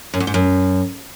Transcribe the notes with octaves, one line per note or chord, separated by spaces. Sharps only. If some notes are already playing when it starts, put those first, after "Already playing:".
F#2
E2
G#2
F#2